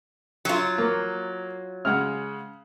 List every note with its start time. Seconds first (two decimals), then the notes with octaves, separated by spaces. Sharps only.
0.45 F#3 F4
0.78 A#3
1.85 C#3 G#3 F#5 F6